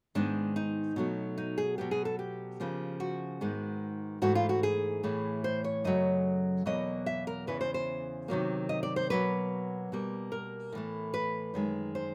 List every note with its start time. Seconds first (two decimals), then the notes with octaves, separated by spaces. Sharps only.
0.15 G#2 D#3 G#3 B3 D4
0.56 D#4
0.96 B2 F#3 A3
1.38 D#4
1.58 G#4
1.78 B2 F#3 B3 G4
1.91 G#4
2.05 A4
2.19 G4
2.60 C#3 F3 A#3
3.00 F#4
3.41 G#2 D#3 G#3 B3
4.22 G#2 E3 A3 F#4
4.35 F4
4.49 F#4
4.63 G#4
5.03 A2 E3 A3
5.44 C5
5.64 C#5
5.84 F#2 C#3 F#3 A3 D#5
6.66 E2 B2 F#3 A#3 D#5
7.06 E5
7.27 A#4
7.47 E2 C#3 E3 B4
7.61 C5
7.74 C5
8.28 C3 D#3 F#3 A#3
8.69 D#5
8.83 D5
8.96 C5
9.10 B2 F#3 A#3 B4
9.92 B2 G3 A#3
10.32 A#4
10.72 A2 E3 A3
11.14 B4
11.54 F#2 D#3 G#3
11.95 C5